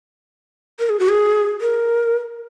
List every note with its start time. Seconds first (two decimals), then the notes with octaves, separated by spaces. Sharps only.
0.79 A#4
0.90 G#4
0.99 F#4
1.09 G#4
1.61 A#4